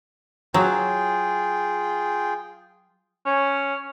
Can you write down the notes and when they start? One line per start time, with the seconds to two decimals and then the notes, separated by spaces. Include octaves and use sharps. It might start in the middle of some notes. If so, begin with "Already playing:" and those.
0.54 F#3 F4 G#4 G5
3.26 C#4